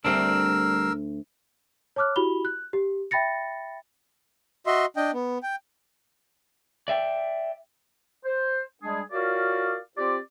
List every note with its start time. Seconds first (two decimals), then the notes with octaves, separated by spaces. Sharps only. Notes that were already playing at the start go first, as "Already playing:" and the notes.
0.04 D2 G3 C4 D4 E4 A#4 E5 E6
1.96 C#5 A5 D6 F6 F#6
2.16 E4 F#4 G4 B5 F7 G7
2.45 F#6
2.73 G4
3.11 E5 G5 B5 A6 A#6 C#7
4.66 F#4 D#5 E5 C6
4.96 D4 D#5 G5
5.13 B3
5.43 G5
6.88 D5 E5 G5
8.25 C5
8.83 G3 G#3 D4 G#4
9.12 F4 F#4 A#4 C#5 D5 F5
9.97 C4 F4 G4 C5 D5